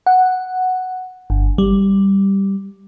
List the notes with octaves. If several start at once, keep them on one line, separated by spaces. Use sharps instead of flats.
F#5
G1
G3